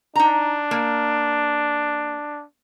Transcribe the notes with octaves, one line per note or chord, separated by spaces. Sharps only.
D4 D#4 A#5
A#3